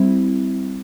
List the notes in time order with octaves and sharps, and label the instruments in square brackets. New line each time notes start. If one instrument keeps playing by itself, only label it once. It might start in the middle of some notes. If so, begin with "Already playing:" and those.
Already playing: [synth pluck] G3 C4 E4